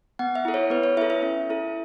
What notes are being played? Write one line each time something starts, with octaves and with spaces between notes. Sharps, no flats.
B3 F#5
E5
E4 A4
C#5
B3 B4
C#5
E4 A4 E5
E5
C#4
E4 A4